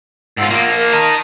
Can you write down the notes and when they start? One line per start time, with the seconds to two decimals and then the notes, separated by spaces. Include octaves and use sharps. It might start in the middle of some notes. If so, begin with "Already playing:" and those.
0.38 G#2 F4 F#5 E6
0.51 F3 A#3 F4
0.75 A#4
0.93 A#4 D#5 A5